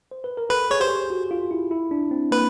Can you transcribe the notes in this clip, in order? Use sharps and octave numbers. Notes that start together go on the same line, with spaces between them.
C5
B4
A#4
A4 B4
G#4 C#5
G4 C5
F#4
F4
E4
E4
D4
C4
A#3 B4